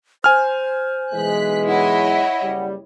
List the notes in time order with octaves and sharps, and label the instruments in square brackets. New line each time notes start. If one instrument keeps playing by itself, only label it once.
[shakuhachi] C5 [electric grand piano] G#5 F6
[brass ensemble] B1 E3 G#3 [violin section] F#6 B6
[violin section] E4 C#5 D#5 [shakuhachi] F#5
[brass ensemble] F#1 G3